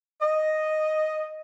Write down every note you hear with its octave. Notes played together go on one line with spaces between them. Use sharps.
D#5